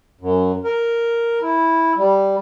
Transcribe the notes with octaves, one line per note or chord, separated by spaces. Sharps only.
F#2
A#4
E4
G3